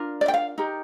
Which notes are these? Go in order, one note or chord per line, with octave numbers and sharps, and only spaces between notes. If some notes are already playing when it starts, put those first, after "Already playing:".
Already playing: D4 F4 A#4
D5
G5
F5
D#4 G4 A#4